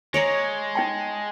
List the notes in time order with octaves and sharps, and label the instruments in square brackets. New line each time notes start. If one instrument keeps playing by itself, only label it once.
[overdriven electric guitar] G#3 [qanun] C#5 D5 A#5
[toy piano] D#4 G5 A5